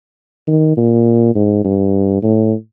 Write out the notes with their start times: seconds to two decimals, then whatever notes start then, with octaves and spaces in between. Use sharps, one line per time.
0.47 D#3
0.77 A#2
1.35 G#2
1.64 G2
2.23 A2